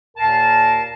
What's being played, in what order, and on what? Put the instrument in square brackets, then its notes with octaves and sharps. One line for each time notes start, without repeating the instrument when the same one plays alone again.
[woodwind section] D#2 A#2 A#4 F5 A5